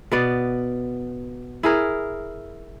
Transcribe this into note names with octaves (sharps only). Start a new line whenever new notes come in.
B2 B3 D5
E4 G#4 A#4